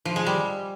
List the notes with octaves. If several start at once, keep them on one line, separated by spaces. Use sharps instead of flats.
F3
G#3
G3